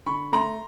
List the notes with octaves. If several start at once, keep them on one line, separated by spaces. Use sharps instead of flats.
D3 B5 C#6
A3 A#5 C6